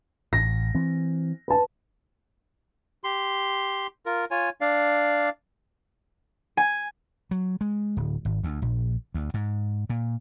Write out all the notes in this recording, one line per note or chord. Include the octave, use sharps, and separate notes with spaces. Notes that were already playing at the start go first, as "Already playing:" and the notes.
A1 A#6
E3 C4
B4 A5
G4 C6
F4 A#4
F4 C#5 G#5
D4 D5 F5
G#5
F#3
G#3
D1
G#1
D2
A#1
D2
G#2
A#2